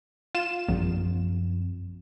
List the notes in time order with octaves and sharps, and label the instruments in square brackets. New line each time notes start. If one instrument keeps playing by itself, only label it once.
[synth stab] F4 E7
[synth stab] A#1 [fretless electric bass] F#2 F3 C4